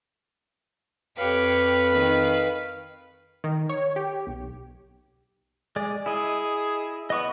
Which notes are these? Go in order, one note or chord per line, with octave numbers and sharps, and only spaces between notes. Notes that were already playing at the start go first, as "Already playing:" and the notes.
F2 G4 B4 C#5 F5
D#3
D#3
C#5
G4
B1
G#3 G#4 D5
E4 G#4 D#5
B3 D#5 C#6 D#6